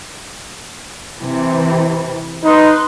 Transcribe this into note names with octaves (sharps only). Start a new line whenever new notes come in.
C3 E3
D#4 B4 C6